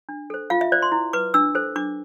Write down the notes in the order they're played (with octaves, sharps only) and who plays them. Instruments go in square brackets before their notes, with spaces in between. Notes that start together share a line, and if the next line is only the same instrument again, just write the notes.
[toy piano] D4
A4 C5
F4 F5
E5
C5 D5
C6
E4
B4 D6
D4 E6
A4 C5
D4 D6